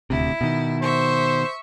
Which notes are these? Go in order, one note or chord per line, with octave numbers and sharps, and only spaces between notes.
D#1 D2 C3 E4
B2 D#3
C5 E5 C#6